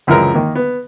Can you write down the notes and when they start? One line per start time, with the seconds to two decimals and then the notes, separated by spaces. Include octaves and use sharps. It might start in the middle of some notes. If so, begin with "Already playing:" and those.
0.07 C#2 F#2 E3 F3 G#3 A#4
0.34 D#3 A#3
0.55 B3